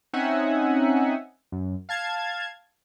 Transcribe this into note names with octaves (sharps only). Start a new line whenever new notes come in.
C4 C#4 D#4 E5 F#5 G#5
F#2
F5 A5 G#6